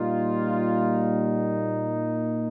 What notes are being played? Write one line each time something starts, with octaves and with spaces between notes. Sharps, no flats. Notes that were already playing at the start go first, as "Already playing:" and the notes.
Already playing: A#2 G3 A#3 D#4 F4